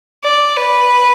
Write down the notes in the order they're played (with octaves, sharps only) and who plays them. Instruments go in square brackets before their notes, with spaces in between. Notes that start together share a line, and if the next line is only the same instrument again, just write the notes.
[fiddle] D5
B4